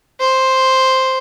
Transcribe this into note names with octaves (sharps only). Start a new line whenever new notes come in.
C5